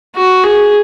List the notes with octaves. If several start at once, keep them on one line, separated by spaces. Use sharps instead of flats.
F#4
G#4